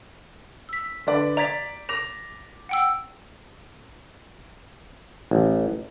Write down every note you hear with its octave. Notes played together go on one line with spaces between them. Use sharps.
E6 B6
D3 B4 D5
D5 A#5 G#6 A6 B6
D6 A#6 F7
F#5 G5 E6
A1